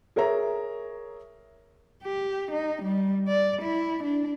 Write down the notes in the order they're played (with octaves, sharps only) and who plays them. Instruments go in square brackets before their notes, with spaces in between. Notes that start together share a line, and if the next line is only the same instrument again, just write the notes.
[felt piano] G#4 A#4 C#5 E5 A#5
[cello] G4
D#4
G3
D5
E4
D4